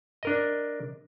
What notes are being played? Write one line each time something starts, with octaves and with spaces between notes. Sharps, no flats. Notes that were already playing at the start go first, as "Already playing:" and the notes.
D4 A#4 D#5